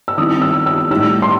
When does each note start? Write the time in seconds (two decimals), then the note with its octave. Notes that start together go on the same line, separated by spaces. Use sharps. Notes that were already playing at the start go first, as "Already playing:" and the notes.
0.08 E6
0.18 D#3 G3 C4 E4 D#6
0.42 E6
0.66 E6
0.90 A2 G3 D#4 E6
1.22 C6